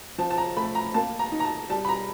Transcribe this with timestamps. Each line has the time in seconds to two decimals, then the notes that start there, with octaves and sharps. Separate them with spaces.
0.18 F3 A5
0.31 A5
0.38 A#5
0.56 A3 B5
0.75 A#5
0.94 A#3 A5
1.19 A#5
1.32 D#4
1.40 A#5
1.45 A5
1.69 G3 A5
1.85 B5
1.89 A#5